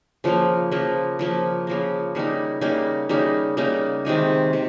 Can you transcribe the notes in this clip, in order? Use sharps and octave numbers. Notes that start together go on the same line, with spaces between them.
C#3 F3 A#3
C#3 F3 A#3
C#3 F3 A#3
C#3 F3 A#3
C#3 G3 A#3 D#4
C#3 G3 A#3 D#4
C#3 G3 A#3 D#4
C#3 G3 A#3 D#4
C3 D#3 G#3 D#4
C3 D#3